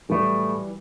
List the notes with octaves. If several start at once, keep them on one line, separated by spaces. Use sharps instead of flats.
A2 E3 F#3 G3 A3